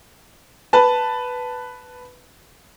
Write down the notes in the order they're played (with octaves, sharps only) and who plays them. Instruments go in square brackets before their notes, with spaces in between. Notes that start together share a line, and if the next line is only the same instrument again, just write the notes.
[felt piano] B4 A5